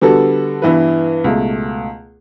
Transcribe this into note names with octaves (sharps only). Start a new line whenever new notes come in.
D3 G3 B3 F#4 A4
G2 E3 B3 E4 B4
C#2 B2 A3